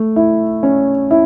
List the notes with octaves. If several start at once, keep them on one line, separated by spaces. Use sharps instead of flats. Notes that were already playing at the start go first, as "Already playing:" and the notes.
Already playing: A3
E4
C#4
E4